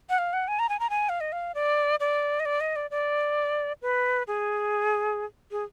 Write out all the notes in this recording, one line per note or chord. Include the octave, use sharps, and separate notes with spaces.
F#5
F5
F#5
G#5
A#5
G#5
A#5
G#5
F5
D#5
F5
D5
D5
D#5
D5
D#5
D5
D5
B4
G#4
G#4